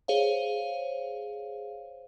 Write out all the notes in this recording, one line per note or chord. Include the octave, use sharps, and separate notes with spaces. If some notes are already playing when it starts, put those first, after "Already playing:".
G#4 C5 C#5 F5